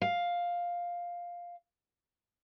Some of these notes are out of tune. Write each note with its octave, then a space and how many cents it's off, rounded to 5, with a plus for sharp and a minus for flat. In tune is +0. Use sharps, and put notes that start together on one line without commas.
F5 +5